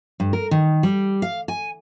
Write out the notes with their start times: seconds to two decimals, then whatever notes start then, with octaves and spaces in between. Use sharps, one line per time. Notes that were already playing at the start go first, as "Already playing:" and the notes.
0.20 G2
0.33 A#4
0.51 D#3
0.83 G3
1.22 F5
1.48 G#5